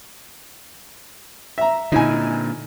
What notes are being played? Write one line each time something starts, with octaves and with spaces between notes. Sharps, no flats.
E5 A#5
A#2 D3 D#4 E4 G#5